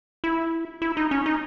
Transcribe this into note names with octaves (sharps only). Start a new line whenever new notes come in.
E4
E4
D#4
C#4
D#4